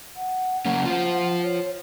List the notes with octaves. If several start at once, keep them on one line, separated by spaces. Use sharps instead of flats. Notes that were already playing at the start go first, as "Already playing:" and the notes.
F#5
F#3 A#3 C#4
F4 C5
C#5